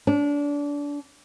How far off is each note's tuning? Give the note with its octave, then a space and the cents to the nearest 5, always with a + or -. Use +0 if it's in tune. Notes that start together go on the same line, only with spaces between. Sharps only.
D4 -25